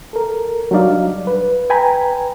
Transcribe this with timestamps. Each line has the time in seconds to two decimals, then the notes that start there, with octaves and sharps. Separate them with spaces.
0.13 A4 A#4
0.71 F#3 G3 D4 D#4 D5 F5
1.27 B4
1.70 B4 G5 G#5 A#5 B5